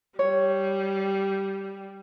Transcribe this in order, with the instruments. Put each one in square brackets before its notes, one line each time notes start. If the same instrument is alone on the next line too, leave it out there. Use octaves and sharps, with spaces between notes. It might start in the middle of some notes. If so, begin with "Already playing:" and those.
[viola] G3 [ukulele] C#5